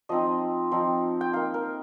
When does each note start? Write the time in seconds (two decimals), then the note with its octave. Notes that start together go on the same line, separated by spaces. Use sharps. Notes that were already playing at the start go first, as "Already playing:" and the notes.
0.09 F3 C4 D#4 D#5
0.71 F3 C4 D#4
1.21 G5
1.33 A#3 D#4 F5
1.54 A#4